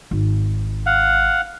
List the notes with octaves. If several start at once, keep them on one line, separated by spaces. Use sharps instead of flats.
G#1
F5 F#5